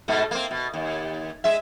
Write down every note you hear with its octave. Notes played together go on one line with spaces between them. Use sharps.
G#2 B2 A3
A#3 C4
B2
D#2
G#3 E5